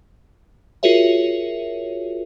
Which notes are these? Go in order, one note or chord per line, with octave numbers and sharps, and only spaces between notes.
F4 F#4 G#4 A#4 C#5 E5